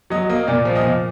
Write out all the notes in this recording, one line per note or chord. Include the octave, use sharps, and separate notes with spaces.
F#3 D#5
A#3 D#5
A#2 D5
F3
D#5
A#2